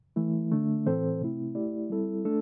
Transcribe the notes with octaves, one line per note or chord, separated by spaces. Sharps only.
E3 A3 E4
D3 A3 D4
A2 E3 C4 A4 C5
C3 A3 C4 E4
A3 E4 G4 D5
G3 C4 E4 A4
A3 D4 A4